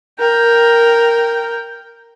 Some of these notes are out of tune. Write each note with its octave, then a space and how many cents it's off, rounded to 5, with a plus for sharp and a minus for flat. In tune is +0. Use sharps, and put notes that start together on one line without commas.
A#4 +0 G5 +0